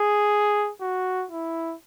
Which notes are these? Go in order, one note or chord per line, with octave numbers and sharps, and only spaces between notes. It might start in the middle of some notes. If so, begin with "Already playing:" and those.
Already playing: G#4
F#4
E4